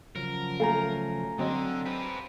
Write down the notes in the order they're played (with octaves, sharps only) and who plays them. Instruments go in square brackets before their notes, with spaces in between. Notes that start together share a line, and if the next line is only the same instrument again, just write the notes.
[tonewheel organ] C#3 F3 F#3 [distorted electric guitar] A#4
[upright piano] A3 [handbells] F5 G#5 A#5
[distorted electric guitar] D3 [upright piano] F#3 C4 D#5
[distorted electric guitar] G4 B4 [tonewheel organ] C5